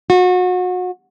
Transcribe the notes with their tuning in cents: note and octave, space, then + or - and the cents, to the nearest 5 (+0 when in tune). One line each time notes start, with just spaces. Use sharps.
F#4 -30